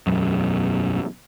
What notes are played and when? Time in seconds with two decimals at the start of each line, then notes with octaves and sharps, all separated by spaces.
0.07 E1 B1 F#2